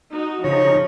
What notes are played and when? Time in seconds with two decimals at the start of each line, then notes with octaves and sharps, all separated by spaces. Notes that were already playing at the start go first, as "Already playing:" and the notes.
0.12 D#4 F#4
0.44 C#3 F3 D#4 C#5